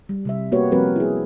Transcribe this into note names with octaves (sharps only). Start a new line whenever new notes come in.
G3
C3 G3 E5
A#3 B3 F#4 G4 B4 C#5
F3 G3 C4 F#4 A#4 B4
E4 G#4